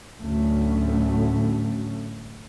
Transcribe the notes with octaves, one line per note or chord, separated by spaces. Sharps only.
D2 A2 F#3 A3 C#4